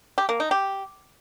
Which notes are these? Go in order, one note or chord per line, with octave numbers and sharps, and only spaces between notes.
G4
A#3
D#4
G4